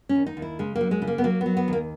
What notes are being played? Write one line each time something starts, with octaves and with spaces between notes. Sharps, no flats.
C#4
D#2
D#4
D#2
E4
C#3 G#3
A#3
F#3
G#3
C#3
A#3
B3
F#3 A#3
B3
F#3
B3
D#2 A#3